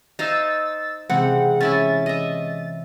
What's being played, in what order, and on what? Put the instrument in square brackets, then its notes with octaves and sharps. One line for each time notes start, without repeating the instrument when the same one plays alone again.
[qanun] D#4 C5 F5 [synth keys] E6 A6
[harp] C3 E3 G#3 [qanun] C4 [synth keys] F#5
[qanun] C#4 E4 E5 [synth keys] A6
[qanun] D#5 E5